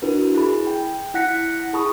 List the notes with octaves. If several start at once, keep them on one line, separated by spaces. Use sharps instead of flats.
D4 E4 F#4 A#4 B4
E4 G#4 B5
G5
E4 F#5 F#6 A#6 B6 C#7
E4 G#4 A5 B5 C#6 D#6